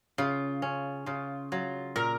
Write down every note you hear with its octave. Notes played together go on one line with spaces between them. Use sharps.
C#3 F4
C#4
C#3 F4
F#3 F4
A#2 A#4